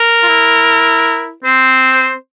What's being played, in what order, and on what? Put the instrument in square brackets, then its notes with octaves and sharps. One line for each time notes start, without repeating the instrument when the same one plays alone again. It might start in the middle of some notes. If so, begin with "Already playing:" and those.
Already playing: [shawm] A#4
[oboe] F4
E4
[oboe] C4 [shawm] C5